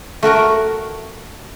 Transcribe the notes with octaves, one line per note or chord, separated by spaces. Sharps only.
A3 F#4 A#4 A#5